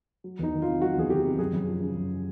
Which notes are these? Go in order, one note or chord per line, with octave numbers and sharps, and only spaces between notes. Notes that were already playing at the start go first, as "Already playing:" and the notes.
F#3
E2 D#4
D#3
F4
C3
F#3 F#4
E2 G#4
D#3 G4
C3
F#2 G#4
F#2
F3
C#3
F#2